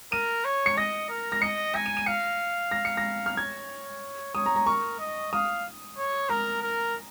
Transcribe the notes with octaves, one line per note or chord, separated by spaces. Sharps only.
A#4 D#7
C#5
C#7
D#5 A#6
A#4
A#6
D#5 C#7
G#5 A#6
D#7
D#7
F5 C#7
A#6
C#7
A#6
F6
C#5 G#6
C#5 D#6
A#5
A#5
A#4 C#6
D#5
F5 D#6
C#5
A#4 A#5
A#4